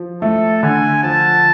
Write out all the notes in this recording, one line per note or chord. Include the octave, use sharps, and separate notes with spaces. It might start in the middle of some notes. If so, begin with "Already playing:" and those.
Already playing: F3
A3 A4
D3 G#5
F3 A5